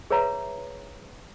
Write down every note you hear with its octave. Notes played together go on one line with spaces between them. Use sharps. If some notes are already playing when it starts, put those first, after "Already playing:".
G#4 B4 C#5 E5 A#5